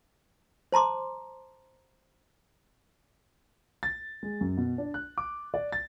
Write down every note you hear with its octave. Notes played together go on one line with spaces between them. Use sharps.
C5 A5 A#5 C6 D6
A6
G#3
F#2
B2
D4
F#6
D6
D5
A6